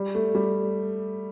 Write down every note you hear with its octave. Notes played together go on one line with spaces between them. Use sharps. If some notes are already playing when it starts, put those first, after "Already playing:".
Already playing: G3
A3
G3